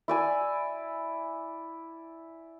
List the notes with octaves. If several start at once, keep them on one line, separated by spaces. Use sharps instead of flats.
E4 D5 G#5